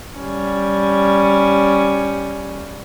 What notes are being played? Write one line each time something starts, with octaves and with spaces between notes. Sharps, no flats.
G3 C#4